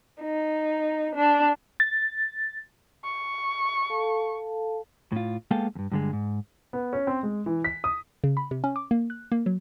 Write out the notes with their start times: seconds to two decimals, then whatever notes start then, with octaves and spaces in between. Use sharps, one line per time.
0.21 D#4
1.15 D4
1.80 A6
3.04 C#6
3.90 A4 F5 A5
5.12 A2 F4
5.51 G#3 A#3 B3 A4 F5 G5
5.75 E2 G2
5.92 G2 D3 G#3
6.13 G#2
6.73 B3
6.93 C#4
7.07 C4
7.23 G#3
7.46 E3
7.64 B6
7.84 D#6
8.24 C#3
8.37 B5
8.51 C3
8.64 C#4
8.76 D6
8.91 A#3
9.10 F#6
9.32 A#3
9.46 F#3